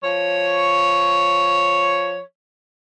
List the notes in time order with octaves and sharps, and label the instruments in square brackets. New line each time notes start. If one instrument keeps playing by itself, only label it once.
[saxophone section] F3 C#5